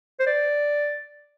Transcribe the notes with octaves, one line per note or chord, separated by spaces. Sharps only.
C5
D5